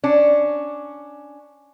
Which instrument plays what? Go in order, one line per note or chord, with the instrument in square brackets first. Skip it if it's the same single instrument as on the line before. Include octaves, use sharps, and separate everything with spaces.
[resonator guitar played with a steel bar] C#4 D4